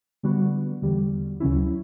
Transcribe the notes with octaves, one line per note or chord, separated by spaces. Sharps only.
D3 G3 B3 F#4
E2 D3 G3
D2 C#3 F#3 C#4 E4